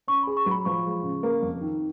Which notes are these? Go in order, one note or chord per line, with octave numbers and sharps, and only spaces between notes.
C#4 C#6
G#4 B5
C#6
F#3
B5
F3 C#6
G#3
C#3
A#3
F2
D#3